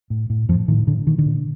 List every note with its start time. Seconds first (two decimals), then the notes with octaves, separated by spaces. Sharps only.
0.10 A2
0.30 A2
0.49 F2 A2 F3
0.68 A2 D#3
0.87 A2 D3
1.06 A#2 D#3
1.18 D3
1.26 A#2